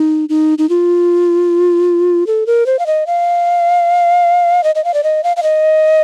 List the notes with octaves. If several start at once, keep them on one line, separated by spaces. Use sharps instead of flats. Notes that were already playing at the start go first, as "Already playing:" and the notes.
Already playing: D#4
D#4
D#4
F4
A4
A#4
C5
F5
D#5
F5
D#5
D#5
F5
D5
D#5
F5
F5
D#5